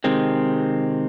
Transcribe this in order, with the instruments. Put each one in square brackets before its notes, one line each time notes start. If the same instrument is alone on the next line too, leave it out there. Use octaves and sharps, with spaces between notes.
[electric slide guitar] C3 D#3 G#3 C4